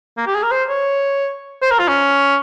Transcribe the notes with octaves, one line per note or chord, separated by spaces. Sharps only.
A#3
G4
G#4
A#4
C5
C#5
C5
A#4
F4
C#4